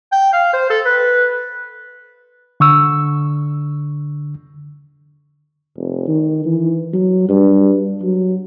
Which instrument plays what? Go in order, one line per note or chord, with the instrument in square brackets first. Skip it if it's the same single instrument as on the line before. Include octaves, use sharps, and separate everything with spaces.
[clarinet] G5
F5
C5
A4
B4
[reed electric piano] D3 C#6 E6
[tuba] F1
D#3
E3
F#3
G2
F#3